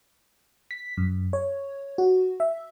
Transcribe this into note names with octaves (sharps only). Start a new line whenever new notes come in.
B6
F#2
C#5
F#4
E5